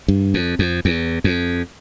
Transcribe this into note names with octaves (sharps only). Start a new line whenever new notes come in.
G2
F2
F2
E2
F2